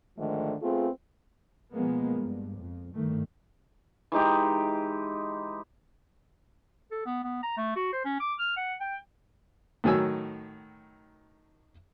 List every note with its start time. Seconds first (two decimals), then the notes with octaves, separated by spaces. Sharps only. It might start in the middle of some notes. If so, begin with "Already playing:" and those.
0.18 G#2 D3 D#3 F3 A3
0.62 A3 B3 C4 F4 G#4
1.72 B2 F3 G#3 A#3 B3
2.14 G2
2.59 F2
2.94 G2 D#3 A3
4.12 E3 G#3 D#4 G4
6.92 A4
7.06 B3
7.24 B3
7.43 A#5
7.58 A3
7.76 F#4
7.93 C5
8.05 C#4
8.20 D6
8.39 F6
8.57 F#5
8.81 G5
9.84 A2 D#3 F#3 G#5 E6